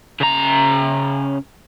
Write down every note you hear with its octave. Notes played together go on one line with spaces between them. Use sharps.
C#3 A#5